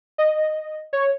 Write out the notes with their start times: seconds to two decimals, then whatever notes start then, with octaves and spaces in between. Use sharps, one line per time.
0.18 D#5
0.93 C#5